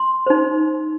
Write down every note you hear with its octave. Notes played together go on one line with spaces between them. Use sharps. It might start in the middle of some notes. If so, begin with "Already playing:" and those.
Already playing: C6
D#4 C5